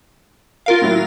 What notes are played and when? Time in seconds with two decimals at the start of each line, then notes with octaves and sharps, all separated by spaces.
0.66 F4 A#4 F5
0.82 A2 F#3 E4